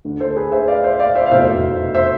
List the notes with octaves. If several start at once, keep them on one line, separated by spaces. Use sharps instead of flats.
D2 D3
A4 C5
G#4 B4
C5 E5
D5 F5
C5 E5
D5 F5
C5 E5
F5
F1 E2 B2 C5 E5
C5 E5